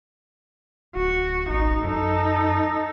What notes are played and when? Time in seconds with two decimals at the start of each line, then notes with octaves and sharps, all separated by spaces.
0.96 D1 F#4
1.50 A1 D#4
1.85 F#2 D#4 A4